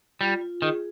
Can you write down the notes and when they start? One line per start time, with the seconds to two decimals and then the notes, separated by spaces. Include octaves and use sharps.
0.21 G3 F4
0.41 F4
0.62 D#3 G#4